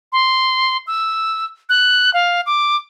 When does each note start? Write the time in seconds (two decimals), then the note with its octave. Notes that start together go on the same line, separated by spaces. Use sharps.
0.13 C6
0.87 E6
1.69 F#6
2.14 F5
2.46 D6